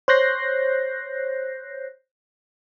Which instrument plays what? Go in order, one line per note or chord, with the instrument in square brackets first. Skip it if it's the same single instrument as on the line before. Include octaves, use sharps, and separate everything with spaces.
[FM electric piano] C5 C#5 F#6 G6 A#6 C7